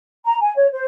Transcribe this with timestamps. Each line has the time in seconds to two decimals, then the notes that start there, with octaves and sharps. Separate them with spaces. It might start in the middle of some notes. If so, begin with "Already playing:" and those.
0.25 A#5
0.40 G#5
0.56 C#5
0.71 C5